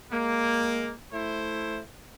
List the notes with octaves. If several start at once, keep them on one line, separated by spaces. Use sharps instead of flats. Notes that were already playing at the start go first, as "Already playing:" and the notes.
G#3 A#3
A3 E4 C5